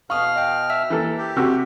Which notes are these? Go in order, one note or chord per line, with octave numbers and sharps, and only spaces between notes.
B2 F5 C#6 D#6 F6
D#5 G5
E5 E6
E3 A#3 A4
G4
C3 F#4 E6